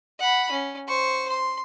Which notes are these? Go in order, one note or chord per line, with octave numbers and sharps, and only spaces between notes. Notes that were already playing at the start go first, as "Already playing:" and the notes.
F#5 B5
C#4
C5 C#6
C6